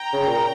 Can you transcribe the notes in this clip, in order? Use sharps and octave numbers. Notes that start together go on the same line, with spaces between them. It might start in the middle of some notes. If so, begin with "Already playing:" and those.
Already playing: G5 A#5
C#3
A#2